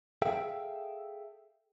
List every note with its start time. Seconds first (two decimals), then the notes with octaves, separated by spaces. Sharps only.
0.22 G#4 A4 E5 F5 G5